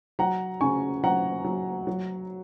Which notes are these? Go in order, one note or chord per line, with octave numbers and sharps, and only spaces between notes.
F#3 F#5 A#5
C#3 G#5 C#6
F#3 F#5 A#5
F#3
F#3